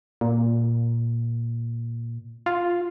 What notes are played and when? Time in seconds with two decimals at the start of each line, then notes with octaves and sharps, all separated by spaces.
0.21 A#2
2.46 F4